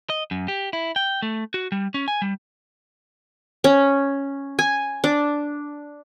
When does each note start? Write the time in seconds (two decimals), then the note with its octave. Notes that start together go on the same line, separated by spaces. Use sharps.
0.10 D#5
0.31 F#2
0.48 G4
0.73 E4
0.96 G5
1.22 A3
1.54 F#4
1.72 G3
1.94 C#4
2.08 G#5
2.22 G3
3.64 C#4
4.59 G#5
5.04 D4